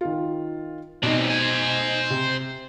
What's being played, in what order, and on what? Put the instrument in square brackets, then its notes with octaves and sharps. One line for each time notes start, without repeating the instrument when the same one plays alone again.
[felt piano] D#3 F4
[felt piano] B2 D#4 [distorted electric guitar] C4 D4
[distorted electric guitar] C5 G#5
[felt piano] C3